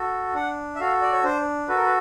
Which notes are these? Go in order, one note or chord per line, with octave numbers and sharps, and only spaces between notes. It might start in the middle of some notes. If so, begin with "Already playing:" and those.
Already playing: F#4 A4
D4 F#5
E5
F#4 A4 F5
D5
C#5
D4 C5
F#4 A4 B4
A#4
B4